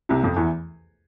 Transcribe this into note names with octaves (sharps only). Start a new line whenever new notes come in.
C2 C3
F2 F3
E2 E3